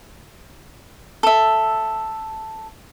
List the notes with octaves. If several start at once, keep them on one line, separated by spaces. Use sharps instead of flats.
A4 E5